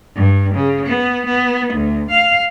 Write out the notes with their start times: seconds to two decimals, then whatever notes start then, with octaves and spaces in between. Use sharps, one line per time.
0.15 G2
0.55 C#3
0.86 B3
1.26 B3
1.74 D2
2.11 F5